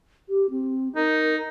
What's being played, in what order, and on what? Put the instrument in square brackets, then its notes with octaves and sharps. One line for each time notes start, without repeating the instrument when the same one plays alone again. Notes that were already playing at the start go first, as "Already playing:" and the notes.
[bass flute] G4
C4
[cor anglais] D#4 [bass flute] A#4